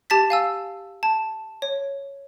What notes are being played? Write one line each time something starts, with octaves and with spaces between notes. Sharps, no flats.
G4 A5 A6 B6
F5 G#5 E6
A5
C#5